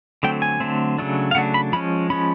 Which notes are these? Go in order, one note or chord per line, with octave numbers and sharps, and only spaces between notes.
D3 F#3 A3 C4 G5
G#5
D3 F#3 A3 C4
C#3 F#3 A3 D4
F5
C#3 F#3 A3 D4 F#5
B5
F3 G#3 C#4 B5
F3 G#3 C#4 B5